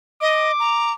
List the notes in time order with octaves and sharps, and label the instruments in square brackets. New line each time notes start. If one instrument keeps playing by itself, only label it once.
[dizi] D#5 [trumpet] D6
[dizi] A#5